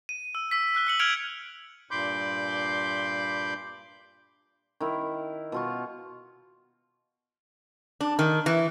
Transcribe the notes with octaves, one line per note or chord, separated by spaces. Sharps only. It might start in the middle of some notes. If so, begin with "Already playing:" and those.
D#7
E6
E6 B6
E6 F#6 G7
E6 C#7 F#7
F6 F#6 G#6 C#7 D7 F7
G2 A#2 B5 C6 D6 G6
D#3 E4
B2 F4 C#6
D4
D#3
E3